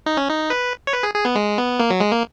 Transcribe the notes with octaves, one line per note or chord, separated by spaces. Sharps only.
D#4
C#4
D#4
B4
C#5
B4
G#4
G#4
B3
G#3
B3
A#3
F#3
G#3
A#3